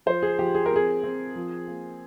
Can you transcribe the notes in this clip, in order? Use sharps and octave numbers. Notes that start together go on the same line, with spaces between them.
F3 C5
G#4
F3 G4
G#4
A#4
C4 G#4
C4
F3
A#3